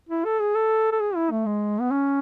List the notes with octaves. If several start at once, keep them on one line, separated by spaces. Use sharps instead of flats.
E4
A4
G#4
A4
A4
G#4
E4
A3
G#3
B3
C#4